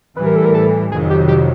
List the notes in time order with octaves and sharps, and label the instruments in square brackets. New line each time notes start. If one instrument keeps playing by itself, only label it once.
[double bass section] A2 E3 G3 [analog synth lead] B4
[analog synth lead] A#4
A4
A#4
A4
[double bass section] F2 C3 D#3 F#3 [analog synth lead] G#4
[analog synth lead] G4
G4